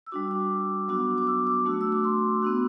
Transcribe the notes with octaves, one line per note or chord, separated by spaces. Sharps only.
E6
G3 D4 F#4 D6
D6
F#3 B3 D4 F#4 D6
D6
E6
D6
A3 D4 F#4
E6
D6
C6
B3 D4 F#4